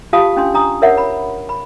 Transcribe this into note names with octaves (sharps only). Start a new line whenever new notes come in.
F4 G4 F5 A5 D#6
C#4 D4 C6
D4 A#5 D#6
A#4 C#5 E5 F#5
B5
B5